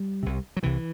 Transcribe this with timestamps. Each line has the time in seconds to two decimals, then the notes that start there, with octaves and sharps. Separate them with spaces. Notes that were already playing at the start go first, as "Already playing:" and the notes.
Already playing: G3
0.23 C2 C3
0.56 F#3
0.63 C2 C3 E3